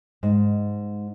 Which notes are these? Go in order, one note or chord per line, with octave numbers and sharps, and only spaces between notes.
G#2